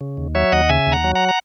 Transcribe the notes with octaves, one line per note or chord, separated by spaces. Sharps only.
C#3
D#2
F#3 C#5 E5
D#2 D#5 F#5
C#3 E5 G#5
D#2
F#5 A#5
F#3
F#5 A#5
A#5